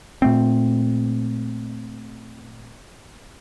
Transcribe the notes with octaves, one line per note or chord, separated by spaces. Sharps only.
A#2 A3 C4